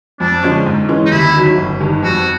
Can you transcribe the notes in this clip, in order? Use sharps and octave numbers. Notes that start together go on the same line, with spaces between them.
F2 D4
D3 F3 G#3 C#4
G#2
E3 G#3 C#4
D#4
D#2 E4
D#3 F#3
G1
G2 D#3
F2 F#4